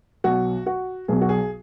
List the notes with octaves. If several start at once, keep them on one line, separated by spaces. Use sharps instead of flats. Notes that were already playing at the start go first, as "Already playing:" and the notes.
B1 B2 F#3 F#4
F#4
B1 B2 F#3 G#4
F#4
G#4